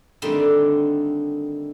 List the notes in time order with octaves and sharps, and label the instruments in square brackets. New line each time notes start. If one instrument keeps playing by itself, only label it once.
[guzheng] D3 D#3 G3 A3 C4 D#4